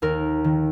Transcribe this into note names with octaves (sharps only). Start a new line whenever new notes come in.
D#2 A#4
D#3